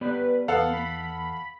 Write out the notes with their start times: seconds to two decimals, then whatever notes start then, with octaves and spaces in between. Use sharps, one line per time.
0.01 B3 G4 B4 D5
0.48 E2 B3 A4 F5 F#5
0.73 B5